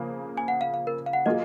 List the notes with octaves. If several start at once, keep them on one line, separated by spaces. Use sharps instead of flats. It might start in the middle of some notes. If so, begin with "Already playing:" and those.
Already playing: C#3 F3 A#3
G#5
F#5
F5
F5
A#4
F5
F#5
F#3 A#3 F4 G#4 D#5